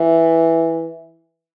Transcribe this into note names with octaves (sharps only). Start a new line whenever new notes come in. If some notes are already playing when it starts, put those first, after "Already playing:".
Already playing: E3